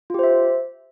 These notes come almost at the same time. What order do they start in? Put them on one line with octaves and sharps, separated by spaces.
F4 G4 C5 E5